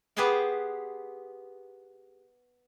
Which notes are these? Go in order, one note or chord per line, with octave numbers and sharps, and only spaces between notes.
B3 G4 G#4 B4 C5 G5